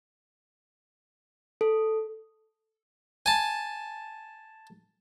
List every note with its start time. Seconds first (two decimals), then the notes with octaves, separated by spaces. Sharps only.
1.61 A4
3.26 G#5 A5